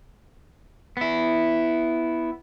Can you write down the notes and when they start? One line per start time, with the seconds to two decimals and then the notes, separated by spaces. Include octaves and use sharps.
0.97 B3 E4